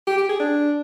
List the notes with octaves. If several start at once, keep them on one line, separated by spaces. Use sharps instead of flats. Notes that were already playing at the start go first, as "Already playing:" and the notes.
G4
G4
G#4
D4